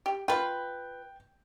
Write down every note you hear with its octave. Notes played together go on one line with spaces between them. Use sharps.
G4
F4 B4 G5